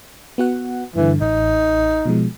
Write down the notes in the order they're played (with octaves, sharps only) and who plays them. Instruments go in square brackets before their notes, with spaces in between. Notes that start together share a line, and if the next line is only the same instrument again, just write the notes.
[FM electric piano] B3 F#4 F#5
[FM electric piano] G2 D3 [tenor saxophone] E3
[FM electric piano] A1 [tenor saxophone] D#4
[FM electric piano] B2 F3 G#3